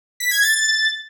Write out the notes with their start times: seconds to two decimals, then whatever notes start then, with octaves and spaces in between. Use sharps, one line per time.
0.20 B6
0.31 G#6
0.42 A6